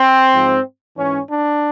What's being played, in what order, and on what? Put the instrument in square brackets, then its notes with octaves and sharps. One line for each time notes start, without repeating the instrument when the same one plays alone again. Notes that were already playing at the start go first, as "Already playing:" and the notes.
Already playing: [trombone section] C4
G#2 F3
G#2 E3 C#4
D4